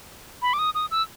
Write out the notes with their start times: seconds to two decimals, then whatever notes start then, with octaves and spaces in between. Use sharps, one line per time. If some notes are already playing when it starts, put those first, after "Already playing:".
0.42 B5
0.53 D6
0.59 D#6
0.75 D#6
0.91 E6